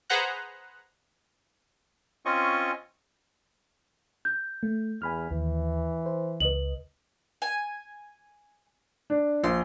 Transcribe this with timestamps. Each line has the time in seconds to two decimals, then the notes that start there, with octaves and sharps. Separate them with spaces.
0.10 G#4 B4 C5 F#5 A#5 F#6
2.26 C4 C#4 F4 D#5 C#6
4.25 G6
4.63 A3
5.02 E2 G#5 B5 F6
5.31 D#2 E3
6.06 C5
6.40 C#2 B4 D#5 F#7
7.42 G#5
9.10 D4
9.44 A#1 C6